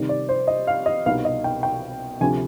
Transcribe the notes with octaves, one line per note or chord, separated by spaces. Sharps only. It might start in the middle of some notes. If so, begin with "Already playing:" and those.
Already playing: C3 D#3 G3
D5
C5
D#5
F5
D#5
C2 B2 B3 D#4 F5
D#5
G5
G5
D2 C3 F3 G#5